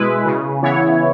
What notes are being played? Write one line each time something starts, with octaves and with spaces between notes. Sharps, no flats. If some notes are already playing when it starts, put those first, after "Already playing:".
Already playing: B2 G#3 E4 B4
C#3
E3 B3 E4 C#5